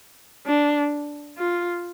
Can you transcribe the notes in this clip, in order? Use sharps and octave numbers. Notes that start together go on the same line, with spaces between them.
D4
F4